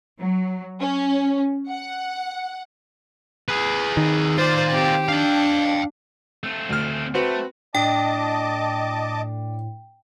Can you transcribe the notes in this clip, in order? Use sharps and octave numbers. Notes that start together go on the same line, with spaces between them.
F#3
C#4
F#5
G#4 B4
D#3
F4 C5 D5
C4 G4
D4 F5 G5
A3 C4
D2 F6
A3 C4 F#4 B4
A2 D4 D#5 G5 A5 D6